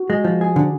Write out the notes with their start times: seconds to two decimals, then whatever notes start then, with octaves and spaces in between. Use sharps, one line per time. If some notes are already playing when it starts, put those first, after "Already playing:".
Already playing: F#4
0.10 G#3
0.24 F3
0.41 G#4
0.56 D3